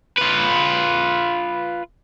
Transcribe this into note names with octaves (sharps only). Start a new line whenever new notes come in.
F4 B4